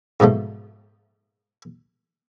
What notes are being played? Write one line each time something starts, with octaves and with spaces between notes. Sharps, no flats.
G#2 B2 F3 A3